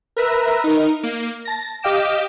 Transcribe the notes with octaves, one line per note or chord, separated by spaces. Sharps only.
A#4 B4 E5 A#5
D#4 A#4
A#3
A5 A#6
G4 D#5 F5 G5 D6 E7